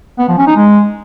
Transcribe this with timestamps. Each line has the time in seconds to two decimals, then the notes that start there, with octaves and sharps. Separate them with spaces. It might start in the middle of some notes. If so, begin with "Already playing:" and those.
0.19 B3
0.28 F3
0.38 C#4
0.47 D#4
0.57 G#3